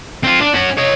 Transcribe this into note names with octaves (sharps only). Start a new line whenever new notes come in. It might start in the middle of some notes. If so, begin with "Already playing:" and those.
C4 F4
D4
C#4 F#4
C#5 D#5